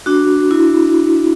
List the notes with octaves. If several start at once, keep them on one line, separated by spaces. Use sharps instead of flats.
D4 F#4
E4